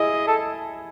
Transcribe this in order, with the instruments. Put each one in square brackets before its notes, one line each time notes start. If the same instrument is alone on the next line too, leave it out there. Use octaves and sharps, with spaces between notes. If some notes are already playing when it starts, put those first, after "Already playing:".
Already playing: [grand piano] E4 G#4 [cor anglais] D#5
[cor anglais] A4